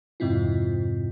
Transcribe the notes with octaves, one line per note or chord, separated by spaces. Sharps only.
F2 G#2 C3 C4 E4 F4